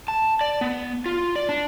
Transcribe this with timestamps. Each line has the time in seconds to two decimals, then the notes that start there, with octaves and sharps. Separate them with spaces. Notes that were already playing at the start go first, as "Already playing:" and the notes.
0.08 A5
0.41 D5
0.61 B3
1.06 F4
1.36 D5
1.49 D4